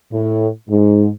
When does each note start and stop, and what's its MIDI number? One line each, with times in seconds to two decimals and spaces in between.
0.12 0.47 45
0.69 1.09 44